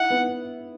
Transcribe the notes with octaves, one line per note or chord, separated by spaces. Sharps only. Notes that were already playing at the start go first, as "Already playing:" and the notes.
Already playing: E4 F#5
B3